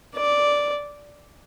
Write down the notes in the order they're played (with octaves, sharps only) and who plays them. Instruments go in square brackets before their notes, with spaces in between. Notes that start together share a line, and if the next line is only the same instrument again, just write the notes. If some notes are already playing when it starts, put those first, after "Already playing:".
[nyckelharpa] D5